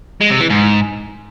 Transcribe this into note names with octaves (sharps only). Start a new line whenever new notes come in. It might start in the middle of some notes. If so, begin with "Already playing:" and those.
G#3
C3
E3
G#2